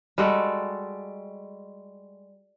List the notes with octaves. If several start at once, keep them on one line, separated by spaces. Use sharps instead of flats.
G3 G#3 F#4 A4